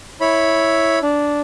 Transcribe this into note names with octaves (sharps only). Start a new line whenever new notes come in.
E4 C#5 B5
D4